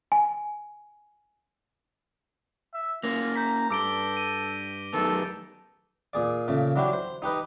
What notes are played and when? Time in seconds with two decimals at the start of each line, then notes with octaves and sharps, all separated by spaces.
0.12 G#5
2.74 E5
3.03 A#3 C#4 F4 A#6
3.36 A#5 G6 B6
3.70 G2 A4 D6 D7 G7
4.17 D#7
4.93 F#2 D#3 B3 A4
6.13 A#2 G#4 D5
6.48 A#2 C#3 A3
6.76 F#3 D4 E4 F#4 G4
6.93 C5
7.22 D#4 G4 B4 D#5